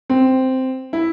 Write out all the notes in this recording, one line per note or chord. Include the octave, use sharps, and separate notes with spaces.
C4
E4